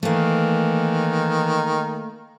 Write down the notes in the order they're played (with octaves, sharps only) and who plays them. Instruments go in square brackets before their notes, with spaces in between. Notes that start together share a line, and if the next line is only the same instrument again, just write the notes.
[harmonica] D#3 [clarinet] E3 [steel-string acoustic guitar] A3 A#3